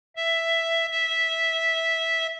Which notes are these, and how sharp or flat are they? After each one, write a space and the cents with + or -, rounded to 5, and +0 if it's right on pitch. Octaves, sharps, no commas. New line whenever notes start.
E5 +5
E5 -10